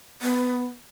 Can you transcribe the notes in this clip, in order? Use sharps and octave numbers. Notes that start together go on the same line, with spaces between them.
B3